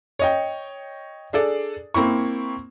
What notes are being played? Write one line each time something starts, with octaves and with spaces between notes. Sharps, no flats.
C#5 D#5 G5
D4 G#4 A4 D5
A#3 C4 E4 C#6